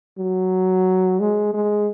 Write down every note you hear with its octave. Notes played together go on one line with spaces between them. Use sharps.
F#3
G#3
G#3